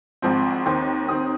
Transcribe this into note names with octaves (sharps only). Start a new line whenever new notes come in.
G#1 G#2 F3 C4
D#2 D#3 C4
D#2 D#3 C4 D#6